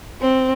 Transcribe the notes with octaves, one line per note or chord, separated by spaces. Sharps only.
C4